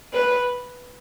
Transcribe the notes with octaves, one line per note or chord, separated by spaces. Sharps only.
B4